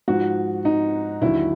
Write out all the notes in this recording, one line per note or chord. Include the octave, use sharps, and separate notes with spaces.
G#2 F3 F#4
D#4
D#2 D3 F#3 E4